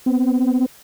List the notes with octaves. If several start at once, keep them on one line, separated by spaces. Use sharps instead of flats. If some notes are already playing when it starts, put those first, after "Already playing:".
B3 C4